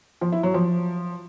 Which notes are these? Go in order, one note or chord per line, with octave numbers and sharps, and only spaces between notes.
F3
E4
F#3
F3